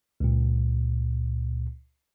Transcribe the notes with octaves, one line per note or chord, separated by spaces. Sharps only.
C#2 A#2